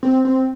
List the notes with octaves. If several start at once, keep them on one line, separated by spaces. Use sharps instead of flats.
C4
C4